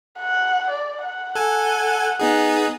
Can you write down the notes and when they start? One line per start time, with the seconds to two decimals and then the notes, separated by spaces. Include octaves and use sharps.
0.19 F#5
0.70 D5
1.05 F#5
1.35 A4 G#5
2.20 B3 D#4 G#4